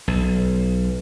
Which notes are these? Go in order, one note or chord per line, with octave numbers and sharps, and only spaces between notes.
B1